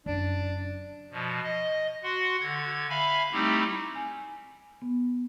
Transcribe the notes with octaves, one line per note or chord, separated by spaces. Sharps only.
F#1 D4
B2 F3
D#5
F#4 F#5 C6
D3 G#6
E5 F5 G#5 B5
G3 A3 C4 D#4 E4 G4
G#5
B3